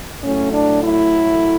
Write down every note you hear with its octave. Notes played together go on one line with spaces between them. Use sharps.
A2 F#3 A3 C#4
D4
E4